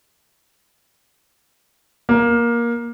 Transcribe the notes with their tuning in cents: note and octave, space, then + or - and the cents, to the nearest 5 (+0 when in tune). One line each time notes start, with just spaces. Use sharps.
A#3 +15